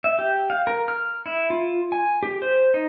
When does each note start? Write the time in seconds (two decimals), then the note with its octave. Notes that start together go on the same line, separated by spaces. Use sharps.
0.04 E5
0.19 G4
0.50 F5
0.67 A#4
0.88 F6
1.26 E4
1.50 F4
1.92 G#5
2.23 G4
2.42 C5
2.74 D#4